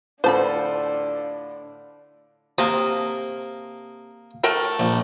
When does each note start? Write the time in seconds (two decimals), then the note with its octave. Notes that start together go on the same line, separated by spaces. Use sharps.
0.24 A2 D3 D4 F4 A4 C5 A5 B5
2.58 C3 A#3 A5 D#6
4.43 A3 A#4 G5
4.80 A#1